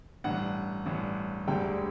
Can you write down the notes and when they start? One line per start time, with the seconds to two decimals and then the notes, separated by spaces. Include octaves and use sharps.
0.24 A1 G2 D3 F#5
0.86 A1 G2 D3
1.47 E1 D2 D3 G3 G5